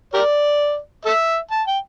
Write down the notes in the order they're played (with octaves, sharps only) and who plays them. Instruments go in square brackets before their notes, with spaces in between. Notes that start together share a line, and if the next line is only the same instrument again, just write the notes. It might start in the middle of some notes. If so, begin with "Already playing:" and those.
[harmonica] G4 A#4 D5
A4 E5
A5
G5